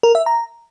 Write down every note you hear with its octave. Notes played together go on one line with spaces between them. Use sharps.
A#4
E5
A#5